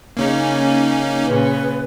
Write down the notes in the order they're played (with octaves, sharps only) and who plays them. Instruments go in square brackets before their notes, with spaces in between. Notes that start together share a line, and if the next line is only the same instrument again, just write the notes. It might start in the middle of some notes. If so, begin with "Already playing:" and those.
[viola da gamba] C#3 [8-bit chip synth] A#3 C#4 D#4
[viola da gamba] A#2 C#3 [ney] B4